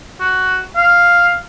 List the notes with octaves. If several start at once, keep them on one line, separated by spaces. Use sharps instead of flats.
F#4
F5